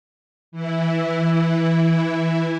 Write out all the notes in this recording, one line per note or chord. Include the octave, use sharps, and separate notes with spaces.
E3 E4